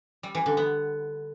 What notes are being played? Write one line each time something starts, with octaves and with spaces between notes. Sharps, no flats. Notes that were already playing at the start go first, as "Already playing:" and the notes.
G3
E3
D3
B3